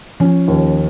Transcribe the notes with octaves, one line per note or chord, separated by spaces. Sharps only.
F3 C#4
D#2